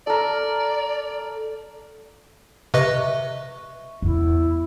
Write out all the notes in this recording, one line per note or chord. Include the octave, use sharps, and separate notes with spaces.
A4 A#4 D5
C3 B4 D#5 E5 C#6
E2 B3 E4